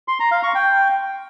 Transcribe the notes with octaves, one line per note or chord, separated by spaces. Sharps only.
C6
A#5
F5
C#6
G5